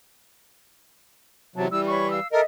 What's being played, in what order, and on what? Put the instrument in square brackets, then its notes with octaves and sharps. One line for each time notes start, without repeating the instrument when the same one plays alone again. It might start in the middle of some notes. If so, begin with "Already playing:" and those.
[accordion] E2 C3 F#3 [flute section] A5
[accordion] E3 G3 [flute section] E6
[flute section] C#5 B5 C#6
F5 E6
[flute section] A4 D#5 E5 [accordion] A#4